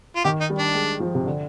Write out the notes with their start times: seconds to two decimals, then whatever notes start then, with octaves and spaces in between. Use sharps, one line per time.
0.16 F4
0.24 D#3 G4
0.41 D#4
0.50 G3
0.58 D4
0.75 G#3
1.00 F3
1.15 C3
1.26 D3